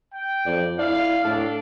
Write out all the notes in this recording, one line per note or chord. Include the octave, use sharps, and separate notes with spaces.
G5
F2 D5
E4 D5 F5
A2 D4 A4